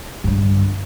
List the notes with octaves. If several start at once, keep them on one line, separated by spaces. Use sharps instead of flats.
G2 D3